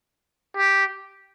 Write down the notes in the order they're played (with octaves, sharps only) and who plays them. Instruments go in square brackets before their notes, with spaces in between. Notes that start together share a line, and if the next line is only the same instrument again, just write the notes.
[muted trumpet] G4